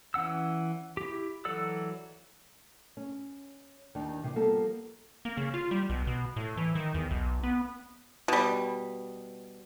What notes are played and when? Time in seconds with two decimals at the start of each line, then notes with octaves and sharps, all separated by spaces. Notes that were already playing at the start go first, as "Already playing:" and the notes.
0.14 E3 C#4 F#5 E6
0.97 E4 G4
1.45 E3 F#3 A4 D5 E6
2.97 C#4
3.95 D#2 D#3 D4
4.24 C3 D#3 E3
4.35 F3 G3 A#3 B3 G4 A4
5.25 A#3
5.37 C#3
5.54 F4
5.71 G3
5.90 B1
6.07 B2
6.36 A2
6.57 E3
6.75 D#3
6.94 E2
7.11 B1
7.43 B3
8.28 B2 G3